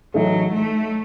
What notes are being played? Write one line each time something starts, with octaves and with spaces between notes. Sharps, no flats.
A2 E3 F#3 A3 D#4 A4
A3